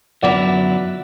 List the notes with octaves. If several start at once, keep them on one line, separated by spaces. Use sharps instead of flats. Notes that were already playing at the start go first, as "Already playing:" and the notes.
F#2 D3 F#3 B3 E4 D5 F#5